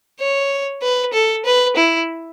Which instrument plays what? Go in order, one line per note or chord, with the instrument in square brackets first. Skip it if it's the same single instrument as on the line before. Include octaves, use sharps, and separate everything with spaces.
[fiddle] C#5
B4
A4
B4
E4